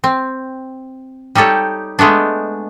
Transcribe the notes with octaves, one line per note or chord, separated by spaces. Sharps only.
C4
G3 D#4 G4 A4 C#5
G#3 A3 B3 D4